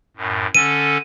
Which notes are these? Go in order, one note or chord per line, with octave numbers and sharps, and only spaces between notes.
F#2 A2
D3 C#4 A4 D#7